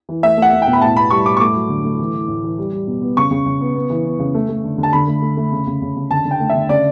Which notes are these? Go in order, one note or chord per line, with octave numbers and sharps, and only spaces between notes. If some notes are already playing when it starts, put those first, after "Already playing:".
E3
A3 E5
A3 F#5
A3
G5
B2
B5
A2 A5
B3 B5
G3 C#6
A2 D6
C#6
A3 D6
F#3
D3
A3
E3
E3
A2
E3
G3
G3
B2
B3
C#3 C#6
C#3
C#3
B3
B3
E3
B3
C#3
A3
A3
D3
D3
A5
D3 B5
A3
A3
A3
C#3
C#3
C#3
C#3
D3 A5
D3
G5
A3
E5
D3
C#3 D5